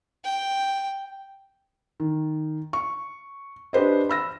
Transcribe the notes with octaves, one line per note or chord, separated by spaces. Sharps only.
G5
D#3
C#6
D4 G4 B4 C5 D#5
B5 E6 A#6